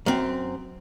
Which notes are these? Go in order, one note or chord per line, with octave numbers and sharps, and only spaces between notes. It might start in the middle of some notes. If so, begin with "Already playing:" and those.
F#2 C4